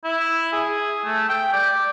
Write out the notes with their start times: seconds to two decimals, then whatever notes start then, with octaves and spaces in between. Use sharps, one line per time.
0.04 E4
0.52 G#4
1.05 A3
1.29 G5
1.53 D5